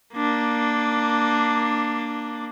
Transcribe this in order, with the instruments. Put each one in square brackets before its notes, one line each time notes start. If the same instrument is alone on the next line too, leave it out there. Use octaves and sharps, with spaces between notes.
[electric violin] A#3 D4